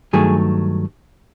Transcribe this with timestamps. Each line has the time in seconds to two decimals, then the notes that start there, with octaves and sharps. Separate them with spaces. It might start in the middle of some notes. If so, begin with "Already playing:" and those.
0.13 G2 D#3 F#3 A3 G#4